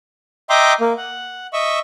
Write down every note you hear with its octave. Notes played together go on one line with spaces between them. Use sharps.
D#5 E5 G5 A#5 C6 D6
A#3
F#5
D#5 E5 C#6 E6